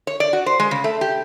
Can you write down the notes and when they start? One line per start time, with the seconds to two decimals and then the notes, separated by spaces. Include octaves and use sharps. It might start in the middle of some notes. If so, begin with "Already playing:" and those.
0.07 C#5
0.20 D5
0.33 F#4
0.46 C5
0.60 G#3
0.71 C#3
0.84 A3
1.01 G4